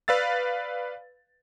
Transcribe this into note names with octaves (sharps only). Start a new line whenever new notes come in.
B4 D5 F5 E6 A6